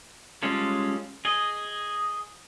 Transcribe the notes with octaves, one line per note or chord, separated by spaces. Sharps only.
G3 G#3 C#4 F4 A4
G#4 D#5